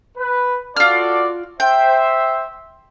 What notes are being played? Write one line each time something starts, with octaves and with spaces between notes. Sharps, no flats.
B4
F4 F#4 A4 D5 F6
C5 E5 G5